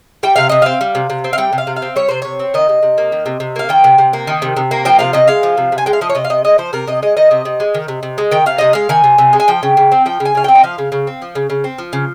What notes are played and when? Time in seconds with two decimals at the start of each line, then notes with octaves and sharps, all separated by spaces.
0.23 G3 G5
0.36 C3 F5
0.49 C3 D#5
0.62 C4 F5
0.81 G3
0.95 C3
1.10 C3
1.24 C4
1.33 F5
1.38 G3 G5
1.53 C3
1.58 F5
1.67 C3
1.76 F5
1.82 C4
1.96 G3 C#5
2.09 C3 C5
2.22 C3 C#5
2.40 C4
2.54 D#3 D#5
2.69 C3
2.83 C3
2.98 A#3
3.12 D#3
3.26 C3
3.40 C3
3.56 A#3 F5
3.69 D#3 G5
3.84 C3
3.98 C3
4.13 A#3
4.27 D#3
4.42 C3
4.57 C3
4.71 A#3
4.85 F3 G5
4.99 C3 F5
5.13 C3 D#5
5.28 G#3 F5
5.43 F3
5.57 C3
5.72 C3
5.78 G#5
5.86 G#3 G5
5.93 F5
6.01 F3 D#5
6.10 C#5
6.15 C3 D#5
6.25 F5
6.30 C3 D#5
6.44 G#3 D#5
6.58 F3 C5
6.73 C3 A#4
6.87 C3 D#5
7.03 G#3 D#5
7.17 D#3 D#5
7.31 C3
7.45 C3
7.60 G#3
7.74 D#3
7.88 C3
8.03 C3
8.18 G#3
8.31 D#3 G5
8.46 C3 F5
8.58 C3 D#5
8.73 G#3 F5
8.89 D#3 G#5
9.04 C3
9.18 C3
9.33 G#3
9.40 G#5
9.48 F3 G5
9.63 C#3
9.77 C#3
9.92 C4
10.06 F3 G5
10.20 C#3
10.25 G#5
10.35 C#3 F5
10.44 C4 G5
10.55 D#5
10.64 F3 F5
10.78 C#3
10.92 C#3
11.07 C4
11.22 F3
11.35 C#3
11.50 C#3
11.64 C4
11.78 F3
11.93 C#3